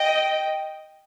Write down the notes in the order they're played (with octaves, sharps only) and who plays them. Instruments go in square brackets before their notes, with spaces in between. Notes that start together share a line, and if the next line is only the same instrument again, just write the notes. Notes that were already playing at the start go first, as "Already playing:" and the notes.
Already playing: [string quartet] D#5 G5